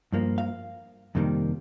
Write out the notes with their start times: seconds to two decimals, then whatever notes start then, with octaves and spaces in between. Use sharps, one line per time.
0.12 G2 F3 A#3
0.38 F5
1.15 F2 C3 D#3 G3 A#3